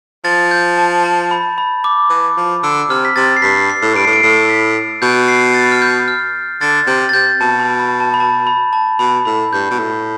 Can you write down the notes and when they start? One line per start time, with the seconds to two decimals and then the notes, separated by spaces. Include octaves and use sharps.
0.24 F3 A6
0.51 G6
0.78 A5
1.04 A5
1.31 B5
1.58 B5
1.84 D6
2.10 E3
2.37 F3
2.63 D3 E6
2.90 C3 F6
3.05 B6
3.16 C3 A6
3.36 C7
3.42 G2 B6
3.70 C7
3.82 A2
3.95 G2 D7
4.04 A2 C7
4.13 D7
4.22 A2 C7
4.49 B6
5.02 B2 G6
5.28 C7
5.54 A6
5.72 F6
5.82 G6
6.08 F6
6.61 D3 A6
6.87 C3 G6
7.09 A6
7.13 C3 G6
7.40 B2 A5
7.60 B5
7.80 B5
8.00 A5
8.14 B5
8.20 A5
8.47 B5
8.73 A5
8.99 B2 B5
9.25 A2 B5
9.53 G2 G6
9.71 B2
9.79 A2